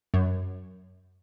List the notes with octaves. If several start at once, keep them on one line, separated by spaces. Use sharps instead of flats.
F#2